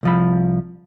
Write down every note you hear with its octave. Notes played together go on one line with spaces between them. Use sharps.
C2 F3 B5